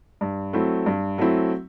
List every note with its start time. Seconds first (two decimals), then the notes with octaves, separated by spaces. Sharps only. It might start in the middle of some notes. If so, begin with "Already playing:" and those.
0.21 G2
0.53 F#3 A3 C4 E4
0.86 G2
1.18 F#3 A3 C4 E4